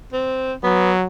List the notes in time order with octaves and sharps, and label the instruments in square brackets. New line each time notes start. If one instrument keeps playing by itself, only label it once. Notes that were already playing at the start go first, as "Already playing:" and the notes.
[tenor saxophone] C4
[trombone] F#3 [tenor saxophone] B3